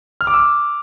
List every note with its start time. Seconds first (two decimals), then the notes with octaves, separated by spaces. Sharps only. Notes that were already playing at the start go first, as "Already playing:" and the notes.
0.21 F6
0.27 D6
0.34 E6